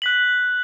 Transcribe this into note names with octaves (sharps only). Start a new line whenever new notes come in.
F#6 B6 F#7